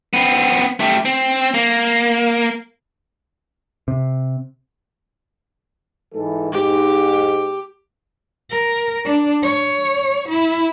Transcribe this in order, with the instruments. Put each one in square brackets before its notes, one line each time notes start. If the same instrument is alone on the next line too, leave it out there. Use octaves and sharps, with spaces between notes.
[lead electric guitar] B3 C4
A3 G4
C4
A#3
[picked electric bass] C3
[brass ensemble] G#2 E3 A4
[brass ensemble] G#2 [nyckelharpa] G4
[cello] A#4
D4
C#5
E4